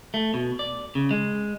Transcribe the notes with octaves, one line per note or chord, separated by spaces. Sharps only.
A3
B2
D5
C#3
G#3